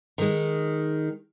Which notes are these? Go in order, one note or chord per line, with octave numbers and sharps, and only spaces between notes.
D#3 G#3